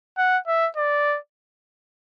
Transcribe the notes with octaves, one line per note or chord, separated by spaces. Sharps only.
F#5
E5
D5